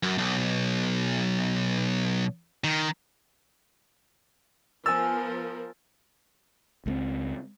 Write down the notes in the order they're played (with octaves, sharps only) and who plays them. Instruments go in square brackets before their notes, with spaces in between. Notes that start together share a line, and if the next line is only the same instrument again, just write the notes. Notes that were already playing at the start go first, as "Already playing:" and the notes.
[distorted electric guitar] F#2
B1
D#3
[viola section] F3 B3 A#4 [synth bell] G#5 A6 [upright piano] E6
[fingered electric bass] C#2 A3 C4